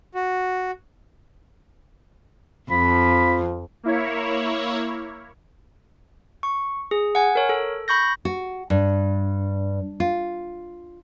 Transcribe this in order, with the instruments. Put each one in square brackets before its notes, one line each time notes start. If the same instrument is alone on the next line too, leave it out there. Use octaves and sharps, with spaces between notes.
[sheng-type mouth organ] F#4
[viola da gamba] F2 [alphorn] F3 [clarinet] B5
[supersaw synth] A#3 E4 C#5
[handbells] C#6
G#4
F#5 G#5
A#4 C#5
A4
B5 C#6 G6 A#6
[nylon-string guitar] F#4
G2
F4